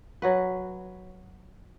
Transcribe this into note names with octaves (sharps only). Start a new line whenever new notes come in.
F#3 F#4 B4